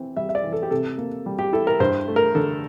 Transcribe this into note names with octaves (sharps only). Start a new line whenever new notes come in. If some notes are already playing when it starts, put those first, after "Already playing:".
Already playing: E3 C4
G3 E5
E5
D5
E3
A4
G4
C3 A4
A#3
G3
G4
E4 A4
A#4
G2 C5
A3
A#4
D3 A4